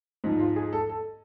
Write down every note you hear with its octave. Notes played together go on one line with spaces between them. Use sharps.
G#2 F3
F4
G#4
A4
A4